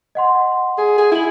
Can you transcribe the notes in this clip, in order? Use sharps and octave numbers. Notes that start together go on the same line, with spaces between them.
D#5 F#5 C6
G#4
G#4
E4 G#6 F#7